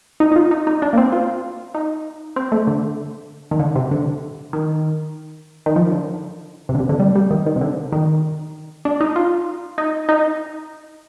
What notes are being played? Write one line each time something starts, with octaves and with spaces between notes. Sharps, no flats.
D#4
D#4
F4
D#4
D#4
D4
A#3
C4
F4
D#4
C4
A3
D3
D#3
D3
C3
D3
D#3
D#3
F3
D3
C3
D3
C3
D3
G3
G3
D#3
D#3
C3
D3
D#3
D4
D#4
F4
D#4
D#4